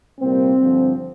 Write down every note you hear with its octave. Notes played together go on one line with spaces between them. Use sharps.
C2 A#2 G3 A#3 C4
G2 D3 F3